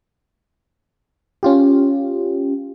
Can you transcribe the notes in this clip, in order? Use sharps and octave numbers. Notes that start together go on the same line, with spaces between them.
C#4 F4 G4